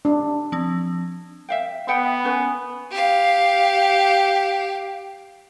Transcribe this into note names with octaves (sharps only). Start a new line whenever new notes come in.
D4
F3 C4
E5 F5 G5
B3 E5 F#5 G5
C#4 B4 G#5
G4 F5